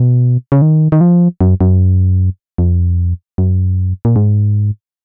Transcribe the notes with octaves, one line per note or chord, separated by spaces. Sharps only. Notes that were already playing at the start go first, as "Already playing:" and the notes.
Already playing: B2
C#3
D#3
D#3
F3
F#2
F#2
F2
F#2
A#2
G#2